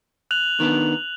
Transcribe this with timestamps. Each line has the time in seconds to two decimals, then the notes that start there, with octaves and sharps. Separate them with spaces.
0.31 F#6 F7 F#7
0.60 D#3 B3 D4